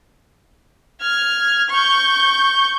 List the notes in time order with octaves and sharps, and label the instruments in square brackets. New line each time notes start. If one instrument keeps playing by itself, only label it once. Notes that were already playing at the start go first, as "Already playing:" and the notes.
[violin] F6 G#6
C#6 G6